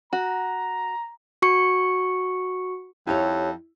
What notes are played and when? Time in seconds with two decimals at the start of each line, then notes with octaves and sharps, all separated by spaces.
0.13 F#4 A#5
1.42 F#4 C#6 C#7
3.07 F2 D#4 E4 G4 C#5